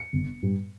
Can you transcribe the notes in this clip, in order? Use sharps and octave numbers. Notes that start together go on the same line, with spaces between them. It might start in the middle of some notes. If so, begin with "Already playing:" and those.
Already playing: C#7
G1
G2 G3